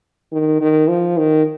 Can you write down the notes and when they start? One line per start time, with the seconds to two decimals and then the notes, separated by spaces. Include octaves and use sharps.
0.32 D#3
0.61 D#3
0.89 F3
1.17 D#3